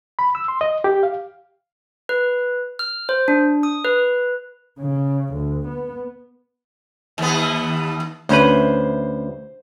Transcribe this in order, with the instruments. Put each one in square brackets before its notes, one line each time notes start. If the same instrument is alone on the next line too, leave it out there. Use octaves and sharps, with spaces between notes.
[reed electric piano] B5
E6
C6
D#5
G4
F5
[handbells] B4
F6
C5
D4
D#6
B4
[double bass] C#3
D2
B3
[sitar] D#2 B3
[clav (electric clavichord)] D2 C#4 B4 [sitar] C5